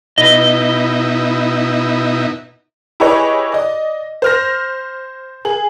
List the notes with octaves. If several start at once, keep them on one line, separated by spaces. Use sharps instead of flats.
B2 D#4 E4 B4 D#5
E4 G4 G#4 B4 C#5 D#5
D5 D#5
C5 F6 A#6
G#4 F#7